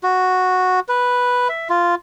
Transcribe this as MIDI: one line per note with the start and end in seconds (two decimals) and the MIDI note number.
0.03 0.80 66
0.89 1.48 71
1.49 1.68 76
1.70 1.95 65